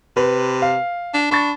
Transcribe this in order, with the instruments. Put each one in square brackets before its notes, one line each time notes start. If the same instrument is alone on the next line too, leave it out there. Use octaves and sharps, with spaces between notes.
[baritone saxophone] C3 [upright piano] B4
[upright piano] F5
[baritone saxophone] D4
[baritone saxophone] D4 [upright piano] B5 C#6 A6